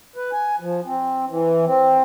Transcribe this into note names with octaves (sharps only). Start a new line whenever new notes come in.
B4
G#5
F3
C4
E3
C4